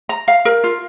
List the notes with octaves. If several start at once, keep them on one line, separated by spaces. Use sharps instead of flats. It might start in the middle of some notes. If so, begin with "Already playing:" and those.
A#5
F5
A#4
F4